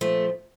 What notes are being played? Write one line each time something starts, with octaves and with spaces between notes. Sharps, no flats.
A#2 F3 A3